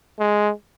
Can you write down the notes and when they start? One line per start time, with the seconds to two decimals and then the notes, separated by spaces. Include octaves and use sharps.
0.19 G#3